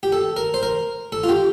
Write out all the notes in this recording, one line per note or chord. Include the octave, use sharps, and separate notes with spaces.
G4
A4
A#4
C5
A#4
A4
F4
G4